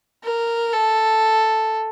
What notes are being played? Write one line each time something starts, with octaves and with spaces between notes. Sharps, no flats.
A#4
A4